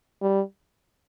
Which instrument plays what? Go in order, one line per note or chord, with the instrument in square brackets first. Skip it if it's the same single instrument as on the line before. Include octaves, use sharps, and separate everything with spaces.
[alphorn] G3